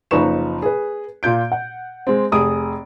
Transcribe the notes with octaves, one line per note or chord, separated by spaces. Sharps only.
F#1 F3 D#4 B4 C#6 E7
G#4 B4
A#2 F4 G6 D7
F#5
G#3 C4
F1 G#4 D#6 D7